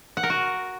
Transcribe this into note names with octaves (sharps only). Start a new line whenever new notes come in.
F#5
A#4
F#4